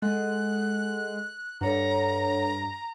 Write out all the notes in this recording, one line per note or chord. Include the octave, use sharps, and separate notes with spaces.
G#3 A4 F#5 F#6
G2 A4 C#5 F#5 A#5